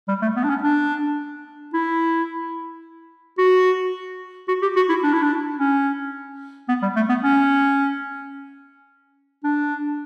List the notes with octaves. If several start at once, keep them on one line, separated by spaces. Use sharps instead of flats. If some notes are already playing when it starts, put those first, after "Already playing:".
G3
A3
B3
D4
C#4
D4
E4
F#4
F#4
G4
F#4
E4
D4
E4
D4
C#4
B3
G3
A3
B3
C#4
D4